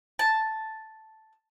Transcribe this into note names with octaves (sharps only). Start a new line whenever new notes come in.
A5